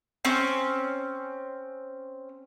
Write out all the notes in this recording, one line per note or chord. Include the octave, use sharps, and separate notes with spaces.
C4 C#4